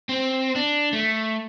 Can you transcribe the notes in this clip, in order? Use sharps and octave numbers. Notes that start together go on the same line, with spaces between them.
C4
D4
A3